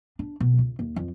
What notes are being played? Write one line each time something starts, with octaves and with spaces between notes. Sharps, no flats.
D4
B2
C#2
D#2
F2